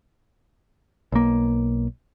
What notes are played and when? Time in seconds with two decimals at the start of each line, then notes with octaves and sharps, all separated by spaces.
1.12 B1 A#3